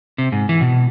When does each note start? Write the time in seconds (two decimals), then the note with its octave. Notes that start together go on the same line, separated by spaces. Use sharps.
0.18 C3
0.32 G#2
0.49 E3
0.61 B2